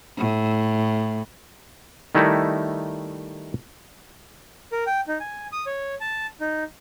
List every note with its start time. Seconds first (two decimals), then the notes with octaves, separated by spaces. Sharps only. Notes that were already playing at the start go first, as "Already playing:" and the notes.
0.18 A2
2.15 D#3 G3 A3 D#4 E4
4.72 A#4
4.87 G5
5.08 D#4
5.20 G#5
5.52 D#6
5.66 C#5
6.01 A5
6.41 D#4